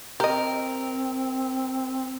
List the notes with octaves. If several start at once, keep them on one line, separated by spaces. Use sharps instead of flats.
C4 G4 A#4 D#5